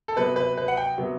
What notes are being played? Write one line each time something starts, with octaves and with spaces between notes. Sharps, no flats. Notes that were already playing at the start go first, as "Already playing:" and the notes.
A4
C3 F#3 B3 B4
B4
B4
F#5
G5
C3 F#3 B3